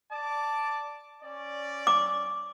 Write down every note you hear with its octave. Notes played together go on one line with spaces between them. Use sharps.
D5 A5 D6
C#4 D5
D6